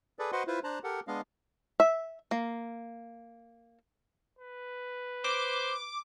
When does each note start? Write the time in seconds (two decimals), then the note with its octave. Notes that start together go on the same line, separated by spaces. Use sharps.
0.19 G#4 A4 B4 D5
0.32 F#4 B4 C5 D#5 F#5 C6
0.47 E4 F4 B4 C5 E5
0.64 D4 C5 A5 A#5 F#6
0.84 G4 A4 A#4 F#5
1.08 G#3 B3 D4 D#5 F5
1.80 E5
2.31 A#3
4.39 B4
5.24 C5 D6